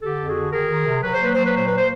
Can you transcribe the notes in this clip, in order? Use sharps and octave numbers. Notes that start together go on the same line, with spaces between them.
D3 G4 A4
F2
F#4 G#4
D3
D#3 G#4 A#4
D#3
C3
F#3 B4
C5
A#3 B4
F#3 C5
B4
A#2 C5
A#3 B4
C5